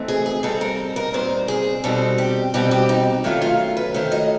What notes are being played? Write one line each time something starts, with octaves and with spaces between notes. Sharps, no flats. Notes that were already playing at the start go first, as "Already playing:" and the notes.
Already playing: E3 A3 C4 D#4
G#4
G#4
A#2 G3 C4 D#4 A4
A#4
A#4
A#2 G3 C4 D#4 C5
G#4
B2 G3 C4 D#4 A4
G4
B2 G3 C4 D#4 G4
G4
D#4
D#3 F#3 A3 C#4 F4
F4
B4
D#3 F#3 A3 C#4 C5
D#5